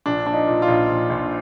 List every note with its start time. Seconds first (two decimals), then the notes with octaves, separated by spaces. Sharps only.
0.06 A#1 D4
0.26 F3 D4
0.33 D#4
0.47 A#2
0.62 F4
0.68 A#1
0.90 A#1
1.10 A#1